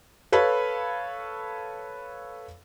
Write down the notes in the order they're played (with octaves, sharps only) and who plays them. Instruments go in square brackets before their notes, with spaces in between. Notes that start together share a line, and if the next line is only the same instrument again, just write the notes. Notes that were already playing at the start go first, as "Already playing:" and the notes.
[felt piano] A4 B4 C#5 F5 B5